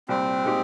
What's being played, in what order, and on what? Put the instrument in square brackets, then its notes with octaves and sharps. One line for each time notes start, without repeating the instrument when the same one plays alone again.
[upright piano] C2 A#2 G3 [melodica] C4
[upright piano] A#2 G#3 D#4 G4